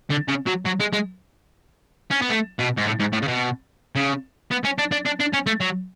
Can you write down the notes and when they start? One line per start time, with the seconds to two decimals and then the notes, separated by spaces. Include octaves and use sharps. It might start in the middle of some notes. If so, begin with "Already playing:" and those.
0.10 D3
0.28 C#3
0.46 F#3
0.65 F#3
0.80 G#3
0.93 G#3
2.11 C#4
2.22 B3
2.30 A3
2.59 B2
2.77 G#2
2.86 A2
2.99 G#2
3.12 A2
3.22 C#3
3.27 B2
3.95 C#3
4.51 B3
4.64 C#4
4.78 D4
4.92 D4
5.05 D4
5.20 D4
5.33 C#4
5.47 A3
5.60 F#3